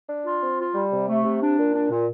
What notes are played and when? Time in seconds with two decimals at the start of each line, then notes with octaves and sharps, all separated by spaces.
0.08 D4
0.25 F4
0.42 C4
0.59 F4
0.74 G3
0.92 C3
1.08 A3
1.25 C3
1.42 D4
1.58 A#2
1.73 D4
1.90 A#2